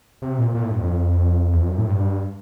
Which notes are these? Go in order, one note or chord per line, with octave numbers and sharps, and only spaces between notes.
C3
A#2
A#2
A2
G2
F2
E2
F2
F#2
A2
G2